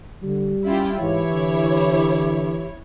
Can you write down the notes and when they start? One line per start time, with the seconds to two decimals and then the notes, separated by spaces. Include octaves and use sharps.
0.23 D3 G3
0.65 C#4 E4 F4 G4
1.01 G#2 E3 E4 G4 C#5
1.32 D3